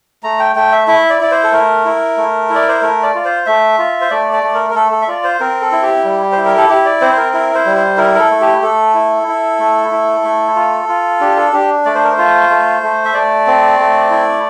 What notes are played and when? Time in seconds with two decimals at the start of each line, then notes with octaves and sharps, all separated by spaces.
0.23 A3 A#5
0.40 G5
0.56 A3 G5
0.72 E5
0.88 E4 E5
1.10 D5
1.21 E4 D5
1.31 C5
1.44 A4
1.52 A3 A#4
1.85 E4
2.17 A3
2.50 E4
2.55 D5
2.69 C5
2.81 A3 A#4
3.03 D5
3.15 F4
3.25 C5
3.46 A3 E5
3.79 F4
4.01 C5
4.10 A3 D5
4.33 D5
4.43 A3
4.54 A#4
4.70 A#4
4.75 A3 A4
4.92 A4
5.02 E5
5.08 F4 D5
5.24 C5
5.40 C4 A#4
5.61 A4
5.72 E4
5.82 G4
6.04 G3
6.32 E4 C5
6.45 A#4
6.57 A4
6.69 E4 G4
6.85 D5
7.01 C4 C5
7.13 C5
7.17 A#4
7.33 E4 A#4
7.55 C5
7.66 G3
7.77 C5
7.97 E4 A#4
8.15 A#4
8.19 A4
8.30 A3
8.41 G4
8.62 A3 A4
8.94 E4
9.28 E4
9.59 A3
9.92 E4
10.24 A3
10.56 F4
10.89 F4
11.20 D4 G4
11.37 A4
11.53 D4 G4
11.85 A3 D5
11.95 C5
12.04 A#4
12.12 C5
12.18 F4
12.50 A3
12.83 A3
13.05 E5
13.14 A3 D5
13.47 C4
13.79 A3
14.11 E4